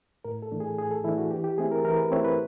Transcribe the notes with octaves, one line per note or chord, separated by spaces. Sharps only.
A2 A#4
A4
E3 A3 D4
G#4
A2 G#4
A4
E3 A3 D4 E4
F#4
E3 G4
G4
A3 C4 E4 G#4
A#4
E3 A#4
B4
A3 C4 E4 C#5
B4